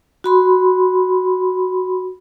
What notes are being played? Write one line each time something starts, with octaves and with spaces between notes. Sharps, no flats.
F#4 B5 C6